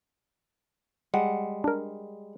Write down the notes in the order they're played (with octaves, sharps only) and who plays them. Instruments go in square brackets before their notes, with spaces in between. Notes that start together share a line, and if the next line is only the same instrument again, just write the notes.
[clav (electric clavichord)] G3 G#3 [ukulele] F#5
[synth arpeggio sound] D4 A#4